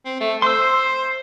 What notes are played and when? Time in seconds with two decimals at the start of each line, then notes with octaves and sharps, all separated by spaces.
0.05 C4
0.20 A3
0.42 C5 C6 E6